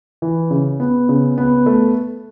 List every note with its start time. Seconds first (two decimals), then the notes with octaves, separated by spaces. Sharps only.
0.22 E3
0.51 C#3
0.80 B3
1.09 C#3
1.38 B3
1.66 A3